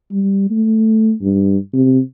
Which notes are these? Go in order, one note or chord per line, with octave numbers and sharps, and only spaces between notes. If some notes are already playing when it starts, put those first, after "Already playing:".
G3
A3
G2
C3